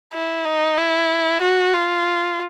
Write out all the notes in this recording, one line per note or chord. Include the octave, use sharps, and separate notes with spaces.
E4
D#4
E4
F#4
F4